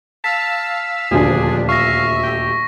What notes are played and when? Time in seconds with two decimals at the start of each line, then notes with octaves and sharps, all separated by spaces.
0.24 F5 A5 E6 B6
1.11 D#1 D2 F3 D4 G#4 G#5
1.69 E5 F5 C#6 A#6
2.24 G4